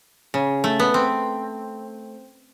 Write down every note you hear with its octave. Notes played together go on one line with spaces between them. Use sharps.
C#3
A3
B3
C4